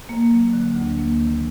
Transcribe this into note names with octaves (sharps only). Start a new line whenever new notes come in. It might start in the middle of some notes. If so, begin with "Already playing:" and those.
A#3
F#3
D3
D2
A#3
D#3